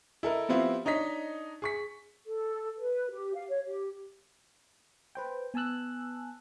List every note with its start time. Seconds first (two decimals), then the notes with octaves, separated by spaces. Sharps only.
0.23 E4 A4 A#4 D#5
0.48 F3 B3 C4 E4 F4 G4
0.85 D4 D#4 C#5 D#5 B6
1.62 G#4 C#6 B6
2.24 A4
2.77 B4
3.11 G4
3.33 F5
3.48 C#5
3.65 G4
5.15 B4 C5 G5
5.54 B3 G#5 A5 E6 F#6